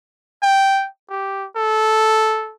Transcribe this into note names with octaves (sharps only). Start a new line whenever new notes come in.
G5
G4
A4